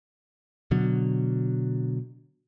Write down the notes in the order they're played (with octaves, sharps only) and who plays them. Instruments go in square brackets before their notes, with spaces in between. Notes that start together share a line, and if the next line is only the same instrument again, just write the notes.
[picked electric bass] B2 D3 F#3